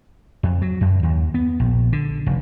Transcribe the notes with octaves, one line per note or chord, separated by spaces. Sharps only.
F2
F#3
F#2
D#2
B3
A#1
D3
F1